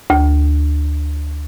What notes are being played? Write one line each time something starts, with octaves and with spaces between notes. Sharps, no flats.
D2